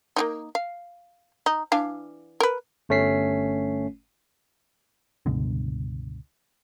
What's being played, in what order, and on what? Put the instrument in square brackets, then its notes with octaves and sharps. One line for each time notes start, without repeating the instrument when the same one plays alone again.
[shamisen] A#3 D4 D#4
F5
D#4
E3 D4 F5
A#4 B4
[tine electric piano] G1 A3 C#4 B6 C7
[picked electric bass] C#2 G2 B2 D3